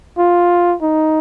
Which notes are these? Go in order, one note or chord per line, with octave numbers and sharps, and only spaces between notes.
F4
D#4